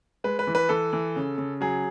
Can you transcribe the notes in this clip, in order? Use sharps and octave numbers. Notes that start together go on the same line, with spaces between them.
G#3 B4
B4
E3
B4
E3 A4
E3
C#3
C#3
F#3 G#4